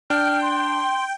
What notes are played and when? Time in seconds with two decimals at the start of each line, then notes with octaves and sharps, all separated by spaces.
0.10 D4 G5 F6
0.42 C6